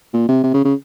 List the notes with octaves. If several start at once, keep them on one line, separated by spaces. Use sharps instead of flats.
A#2
C3
C3
C#3
C#3